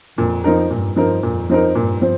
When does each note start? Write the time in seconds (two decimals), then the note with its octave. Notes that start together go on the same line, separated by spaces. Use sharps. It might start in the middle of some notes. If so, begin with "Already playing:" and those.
0.18 F2 A#2
0.44 F3 C4 D#4 A#4
0.70 G2 A#2
0.96 F3 C4 D#4 A#4
1.23 F2 A#2
1.49 F3 C4 D#4 A#4
1.75 G2 A#2
2.02 F3 C4